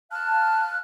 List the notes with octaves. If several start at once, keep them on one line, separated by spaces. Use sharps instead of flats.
F5 A5 F6 F#6